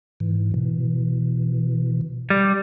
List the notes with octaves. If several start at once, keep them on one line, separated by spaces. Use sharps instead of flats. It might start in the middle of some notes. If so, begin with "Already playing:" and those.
G#2 E3
B2 E3
G3